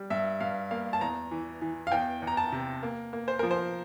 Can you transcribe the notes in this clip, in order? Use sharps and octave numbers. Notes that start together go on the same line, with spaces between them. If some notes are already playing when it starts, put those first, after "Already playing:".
Already playing: G3
G2 E5
G2 F5
A#3 F5
A5
E2 A#5
E3
E3
F5
E2 G5
E2
A#5
A5
C3
A#3
A#3
C5
F3 A#4
C5